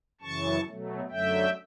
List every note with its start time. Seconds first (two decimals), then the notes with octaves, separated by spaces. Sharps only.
0.21 F#2 C#3 E3 A5 C#6
0.66 B2 F#3 A3
1.10 F#2 D3 F#3 A3 E5 G5